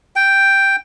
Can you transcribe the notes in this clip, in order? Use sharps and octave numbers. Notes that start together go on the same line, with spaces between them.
G5